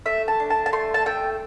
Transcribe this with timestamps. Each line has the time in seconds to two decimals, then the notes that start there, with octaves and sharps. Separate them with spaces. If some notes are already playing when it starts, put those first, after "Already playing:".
0.06 A3 E5
0.28 A5
0.40 D4
0.50 A5
0.66 A5
0.73 A3 C6
0.94 A5
1.06 A3 G5